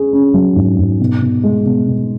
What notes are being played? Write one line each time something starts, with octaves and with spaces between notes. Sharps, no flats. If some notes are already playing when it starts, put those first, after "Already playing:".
Already playing: C#4 G#4
C#4
F#3
G#2
G#2
B2
B2
G#3
B2
B2